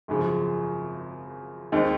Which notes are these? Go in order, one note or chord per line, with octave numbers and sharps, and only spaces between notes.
G#1 F#2 C#3 F3
D#2 D#3 G#3 C4 D#4